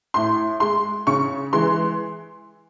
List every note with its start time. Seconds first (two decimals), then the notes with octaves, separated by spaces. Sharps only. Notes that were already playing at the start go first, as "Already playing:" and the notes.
0.14 A2 C6
0.60 G#3 C6
1.07 C#3 C#6
1.53 E3 G#3 C6